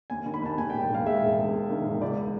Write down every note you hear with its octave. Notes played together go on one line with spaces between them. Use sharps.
D#2 G#5
D#3
B5
D#2 A5
D#2 G#5
G5
E1
G5
E1
F5
G#3 E5
E1
E1
D#2
D#3
E1
C#2 D5